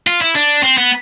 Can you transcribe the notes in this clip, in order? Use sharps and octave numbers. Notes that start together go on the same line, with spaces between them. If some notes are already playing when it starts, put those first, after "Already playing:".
F4
E4
D4
C4
B3